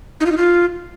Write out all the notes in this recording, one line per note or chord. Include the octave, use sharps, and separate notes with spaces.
D#4
F4
D#4
F4